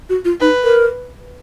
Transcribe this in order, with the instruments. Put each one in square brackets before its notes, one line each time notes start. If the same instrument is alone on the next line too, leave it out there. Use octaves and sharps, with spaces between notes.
[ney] F#4
F4
[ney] D#4 [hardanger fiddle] B4
[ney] A#4